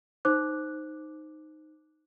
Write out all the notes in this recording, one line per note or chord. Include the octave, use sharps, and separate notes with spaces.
D#4 C5 D6 F#6